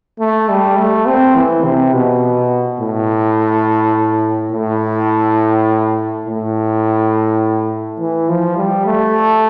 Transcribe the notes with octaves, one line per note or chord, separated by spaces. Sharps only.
A3
G3
A3
C4
E3
C3
B2
A2
A2
A2
E3
F3
G3
A3